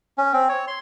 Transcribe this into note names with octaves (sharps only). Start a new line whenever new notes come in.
C#4
C4
C#5
C6